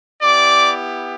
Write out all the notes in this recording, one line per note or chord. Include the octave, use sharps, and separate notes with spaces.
B3 E4 G4 D5 D6